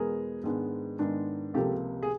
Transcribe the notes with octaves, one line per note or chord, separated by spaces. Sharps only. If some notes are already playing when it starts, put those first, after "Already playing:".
Already playing: E2 B2 G#3 B3 G#4 A#4
G#2 D#3 G#3 B3 D4
G#2 D#3 G#3 B3 D4
C#2 C3 F3 A#3 G4 A4
G#4